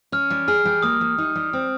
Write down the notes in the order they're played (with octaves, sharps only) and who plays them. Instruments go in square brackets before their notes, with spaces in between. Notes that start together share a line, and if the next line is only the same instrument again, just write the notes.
[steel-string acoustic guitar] C#4 [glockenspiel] F6
[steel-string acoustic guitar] G3
[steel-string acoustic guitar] G#4 [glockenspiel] F6
[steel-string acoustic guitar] G3
[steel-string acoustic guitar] A#3 [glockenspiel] D#6
[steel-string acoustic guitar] G3
D#4
G3
C4